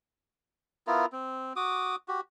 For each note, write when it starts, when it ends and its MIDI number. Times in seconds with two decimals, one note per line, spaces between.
0.87 1.06 59
0.87 1.06 64
0.87 1.06 65
0.87 1.06 70
1.12 1.53 60
1.56 1.96 66
1.56 1.96 86
1.56 1.96 87
2.08 2.21 66
2.08 2.21 67